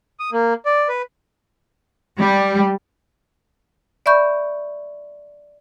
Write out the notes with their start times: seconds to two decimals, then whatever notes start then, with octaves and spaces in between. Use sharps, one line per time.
0.20 D#6
0.32 A#3
0.66 D5
0.89 B4
2.18 G3
4.06 D5 E5 B5 C#6 G6